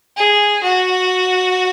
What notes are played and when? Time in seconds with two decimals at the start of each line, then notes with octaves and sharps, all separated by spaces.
0.17 G#4
0.63 F#4